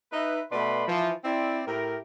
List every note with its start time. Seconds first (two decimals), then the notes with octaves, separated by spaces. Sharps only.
0.12 D#4 B4 E5
0.51 B2 A3 B4 D5 B5 C6
0.88 E3 F3
1.24 C4 E4 D5
1.67 A2 E4 G4 A#4